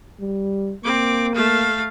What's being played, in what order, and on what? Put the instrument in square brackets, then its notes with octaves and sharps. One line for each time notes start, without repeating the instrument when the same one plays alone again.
[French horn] G3
[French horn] A#3 [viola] C4 D6
[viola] A3 F5